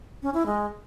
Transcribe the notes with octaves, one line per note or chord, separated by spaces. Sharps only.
C#4
E4
G#3